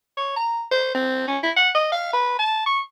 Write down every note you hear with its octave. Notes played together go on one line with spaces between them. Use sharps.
C#5
A#5
C5
C4
C#4
E4
F#5
D#5
F5
B4
A5
C#6